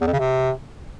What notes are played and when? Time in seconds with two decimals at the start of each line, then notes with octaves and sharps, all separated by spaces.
0.01 E2
0.07 F2
0.13 C#3
0.19 C3